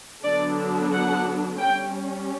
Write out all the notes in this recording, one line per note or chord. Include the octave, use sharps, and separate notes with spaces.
D3 F#3 B3 D4 D5
F#5
G3 C#4 G5